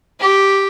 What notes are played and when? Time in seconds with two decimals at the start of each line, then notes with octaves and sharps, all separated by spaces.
0.20 G4